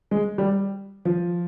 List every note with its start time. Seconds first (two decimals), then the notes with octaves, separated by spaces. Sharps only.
0.11 G#3
0.38 G3
1.05 F3